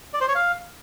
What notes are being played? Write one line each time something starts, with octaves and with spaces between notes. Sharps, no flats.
D5
C5
C#5
F5